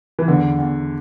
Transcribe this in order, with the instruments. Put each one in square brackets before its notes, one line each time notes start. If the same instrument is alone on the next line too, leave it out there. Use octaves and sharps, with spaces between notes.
[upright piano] E3
[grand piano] E2 [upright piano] D3
[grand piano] E2